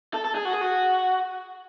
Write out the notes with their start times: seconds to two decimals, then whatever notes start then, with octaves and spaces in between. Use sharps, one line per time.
0.14 A4
0.25 A4
0.35 G#4
0.45 F#4
0.53 G#4
0.61 F#4